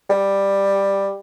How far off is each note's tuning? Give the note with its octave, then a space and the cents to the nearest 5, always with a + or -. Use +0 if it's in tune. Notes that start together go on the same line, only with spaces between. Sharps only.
G3 +10